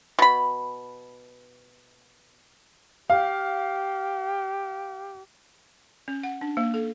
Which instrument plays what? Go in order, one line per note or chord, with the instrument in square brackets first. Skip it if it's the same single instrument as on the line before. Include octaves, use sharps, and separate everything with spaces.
[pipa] B2 B5
[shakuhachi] G4 [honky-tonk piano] F5
[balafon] C#4
F#5
D4
A#3
A4